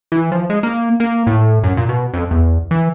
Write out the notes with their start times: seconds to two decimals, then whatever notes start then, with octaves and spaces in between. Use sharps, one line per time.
0.12 E3
0.32 F3
0.50 G#3
0.63 A#3
1.00 A#3
1.27 A2
1.63 F#2
1.77 A#2
1.89 B2
2.14 F2
2.31 E2
2.71 E3